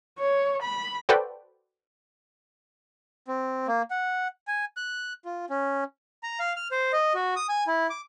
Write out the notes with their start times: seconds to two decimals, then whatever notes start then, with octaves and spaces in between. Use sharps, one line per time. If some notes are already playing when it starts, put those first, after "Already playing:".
0.19 C#5
0.62 B5
1.09 F#4 A4 B4 C5 D5 G5
3.28 C4
3.68 A#3
3.91 F#5
4.47 G#5
4.77 F#6
5.25 F4
5.50 C#4
6.23 A#5
6.40 F5
6.56 F6
6.71 C5
6.93 D#5
7.15 F#4
7.36 D#6
7.49 G#5
7.67 E4
7.90 D6